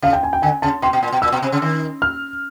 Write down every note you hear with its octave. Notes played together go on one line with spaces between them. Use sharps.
C#3 F5
G5
G#5
G5
D3 G#5
C#3 A5
B2 C6
B2
A#2
B2
A#2 E6
B2
C3
C#3
D#3
F6